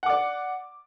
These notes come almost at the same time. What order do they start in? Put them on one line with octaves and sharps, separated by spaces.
F#5 D6 D5